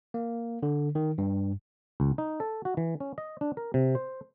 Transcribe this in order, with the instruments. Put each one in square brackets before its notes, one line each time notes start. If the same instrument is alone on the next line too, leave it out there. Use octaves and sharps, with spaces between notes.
[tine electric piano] A#3
D3
D#3
G2
[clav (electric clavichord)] C#2
D#4
A4
F#4
E3
C#4
D#5
D4
A#4
C3
C5